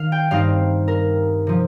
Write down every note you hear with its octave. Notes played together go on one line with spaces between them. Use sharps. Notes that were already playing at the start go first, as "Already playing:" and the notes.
Already playing: D#3 D#4 F5
G5
G2 G3 C4 D#4 F5
A#4
C3 F3